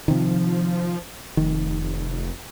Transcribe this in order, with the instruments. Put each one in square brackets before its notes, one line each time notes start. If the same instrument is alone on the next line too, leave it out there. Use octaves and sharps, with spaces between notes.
[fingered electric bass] C3 D#3 [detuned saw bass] F3
[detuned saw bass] F1 [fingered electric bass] D#3